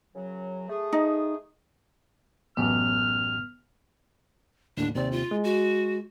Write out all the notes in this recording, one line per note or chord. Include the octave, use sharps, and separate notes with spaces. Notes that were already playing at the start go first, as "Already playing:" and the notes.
F#2 C#3 F#3
A3 G#4
D#4
A1 F#2 B3 F6
D#2 A2 D3 D4
D#2 C3 C4 D5
F4
G#3
F#4